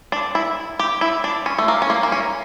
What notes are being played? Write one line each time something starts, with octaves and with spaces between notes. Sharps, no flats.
D4
E4
G4
E4
D4
C#4
A3
A#3
C#4
A#3
A#3
C#4